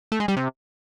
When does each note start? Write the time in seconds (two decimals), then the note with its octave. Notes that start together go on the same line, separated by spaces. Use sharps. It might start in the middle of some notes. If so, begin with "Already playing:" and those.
0.12 A3
0.20 G#3
0.28 G3
0.36 C3